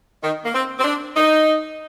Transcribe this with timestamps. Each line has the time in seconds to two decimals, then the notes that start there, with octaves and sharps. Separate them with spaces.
0.22 D#3
0.44 A#3
0.53 C4
0.79 C4
0.84 D4
1.16 D#4